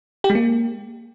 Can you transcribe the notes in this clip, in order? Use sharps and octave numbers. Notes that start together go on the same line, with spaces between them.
G4
G#3
A#3